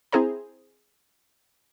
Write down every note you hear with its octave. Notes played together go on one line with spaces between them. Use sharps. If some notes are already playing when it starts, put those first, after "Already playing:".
C4 E4 G#4 C5 A#5